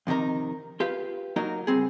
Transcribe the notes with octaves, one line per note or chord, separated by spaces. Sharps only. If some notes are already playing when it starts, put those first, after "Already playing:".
F2 C3 D#3 D#4 A#4
F4 G4 B4 F5
F#3 A#3 D#4 F#4 A#4
C#2 G3 C4 G#4